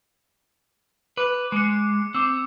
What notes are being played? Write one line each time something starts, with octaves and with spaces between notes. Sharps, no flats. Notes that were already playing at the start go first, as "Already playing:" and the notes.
B4 D6
G#3 D6 C#7
C4 D6 E6